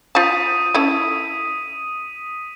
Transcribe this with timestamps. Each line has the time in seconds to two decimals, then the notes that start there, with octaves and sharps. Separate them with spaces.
0.15 F4 C5 A5 D#6 B6 D#7
0.74 C#4 E4 A4